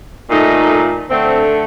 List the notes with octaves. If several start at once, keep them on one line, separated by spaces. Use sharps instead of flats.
A#2 A3 D#4
D3 A3 C4